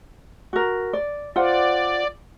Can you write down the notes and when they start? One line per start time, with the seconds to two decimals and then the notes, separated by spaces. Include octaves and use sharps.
0.53 F#4 A#4
0.93 D5
1.36 F4 C5 D5 F#5